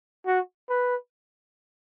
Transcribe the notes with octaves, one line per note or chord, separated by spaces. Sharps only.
F#4
B4